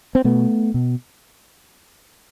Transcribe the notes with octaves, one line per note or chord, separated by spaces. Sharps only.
C4
B2 A3 B3
B2